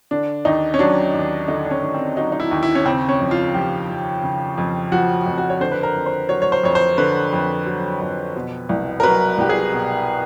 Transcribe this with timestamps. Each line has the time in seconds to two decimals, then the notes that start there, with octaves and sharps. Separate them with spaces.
0.11 D3 D4
0.45 D#2 D#4
0.74 C#4
0.79 F#3 D4
1.14 D#2
1.48 D3 D#4
1.65 D4
1.71 C#4
1.83 D#2
1.94 C4
2.17 F#3 D#4
2.32 D#4
2.40 E4
2.51 D#2
2.63 E4
2.75 C#4
2.85 C#3 C4
3.09 C#4
3.20 F2
3.31 F4
3.54 F3 G4
3.89 F2
4.23 C#3
4.57 F2
4.92 F3 F#4
5.26 F2
5.38 F#4
5.50 C#5
5.61 D3 C5
5.72 B4
5.83 A#4
5.95 F2
6.06 C5
6.29 F#3 C#5
6.42 C#5
6.52 C5
6.63 F2 C#5
6.75 C5
6.98 D3 B4
7.33 F2
7.66 F#3
8.01 F2
8.36 B2
8.69 C2
9.00 A#4
9.03 F#3 B4
9.38 C2 G4
9.49 G#4
9.73 B2